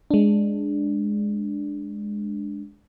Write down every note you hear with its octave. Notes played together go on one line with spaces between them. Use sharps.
G#3 D4